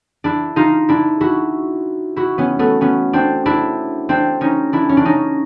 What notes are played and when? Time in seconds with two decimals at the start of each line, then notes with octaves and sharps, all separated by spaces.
0.24 D4 E4
0.56 D#4 F4
0.89 D4 E4
1.21 E4 F#4
2.16 E4 F#4
2.38 B3 C#4
2.59 A3 B3
2.81 B3 C#4
3.13 C4 D4
3.46 D4 E4
4.09 C4 D4
4.41 C#4 D#4
4.73 D4 E4
4.89 C#4
4.97 D4
5.05 C#4 D#4